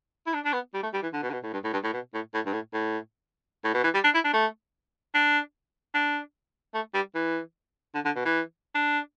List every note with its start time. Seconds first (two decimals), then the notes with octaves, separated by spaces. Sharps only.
0.26 E4
0.34 D4
0.45 D4
0.53 B3
0.74 G3
0.83 A3
0.93 G3
1.03 E3
1.13 D3
1.23 B2
1.30 D3
1.33 B2
1.43 A2
1.53 G2
1.64 A2
1.73 G2
1.84 A2
1.93 B2
2.14 A2
2.34 A2
2.46 G2
2.53 A2
2.73 A2
3.64 A2
3.74 B2
3.84 E3
3.94 G3
4.04 D4
4.14 E4
4.24 D4
4.34 A3
5.14 D4
5.94 D4
6.74 A3
6.94 G3
7.15 E3
7.95 D3
8.05 D3
8.16 B2
8.25 E3
8.75 D4